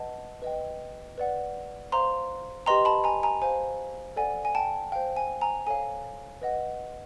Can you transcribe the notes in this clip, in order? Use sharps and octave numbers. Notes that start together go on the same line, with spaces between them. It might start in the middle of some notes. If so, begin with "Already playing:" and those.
Already playing: B4 D#5 F#5 A5
B4 D#5 G5
B4 D5 F#5
C5 F5 A#5 C6
G4 B4 D#5 G5 A#5 C6
A5 B5
G#5 A#5
G#5 A#5
C5 F5 G#5
A4 D5 F#5 G#5
G#5
G5 A5
C5 F5 G5
G#5
G#5 A#5
A4 C#5 F5 G#5
B4 D#5 F#5